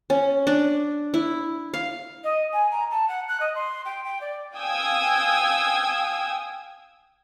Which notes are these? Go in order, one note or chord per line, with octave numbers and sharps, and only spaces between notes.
C#4
D4
E4
F5
D#5
G#5
A#5
A5
F#5
F#6
D#5
C6
G5
G5
D5
F5 G5 G#5 D#6 E6 G#6